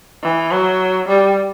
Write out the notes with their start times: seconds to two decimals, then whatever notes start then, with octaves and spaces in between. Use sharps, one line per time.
0.23 E3
0.51 F#3
1.08 G3